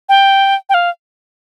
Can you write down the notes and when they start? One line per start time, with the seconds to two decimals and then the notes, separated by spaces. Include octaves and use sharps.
0.09 G5
0.69 G5
0.74 F5